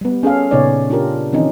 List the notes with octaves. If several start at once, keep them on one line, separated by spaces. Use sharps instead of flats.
G3 B3
C#4 G#4 A4 F5
A#2 C#3 B3 D#4 C#5 D5
D4 F4 G4 A#4
D#3 E3 C4 C#4 D#4